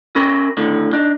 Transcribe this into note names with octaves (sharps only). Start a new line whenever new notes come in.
C#4 A#4 B5
A2 D3 D#3
D4 D#4